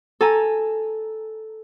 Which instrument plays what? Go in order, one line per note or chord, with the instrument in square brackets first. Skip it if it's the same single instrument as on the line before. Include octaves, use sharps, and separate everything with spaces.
[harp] A4 G#5 A#5